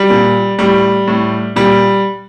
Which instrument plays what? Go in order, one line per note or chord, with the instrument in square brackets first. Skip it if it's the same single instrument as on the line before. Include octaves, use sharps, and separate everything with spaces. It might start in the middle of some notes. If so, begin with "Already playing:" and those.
Already playing: [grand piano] G3
A#2
A2 G3
A2
A#2 G3